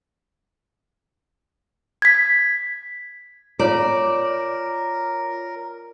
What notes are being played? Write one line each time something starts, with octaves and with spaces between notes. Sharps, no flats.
G#6 B6
F4 A#4 C#5 D5 A#5